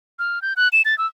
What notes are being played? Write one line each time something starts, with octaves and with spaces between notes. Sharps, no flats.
F6
G6
F#6
E7
A6
E6